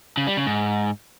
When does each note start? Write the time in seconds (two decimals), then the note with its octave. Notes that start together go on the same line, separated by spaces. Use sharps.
0.17 C#3
0.27 G3
0.37 C#3
0.46 G#2